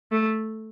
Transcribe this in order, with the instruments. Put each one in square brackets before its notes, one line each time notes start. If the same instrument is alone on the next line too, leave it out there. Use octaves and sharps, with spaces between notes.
[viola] A3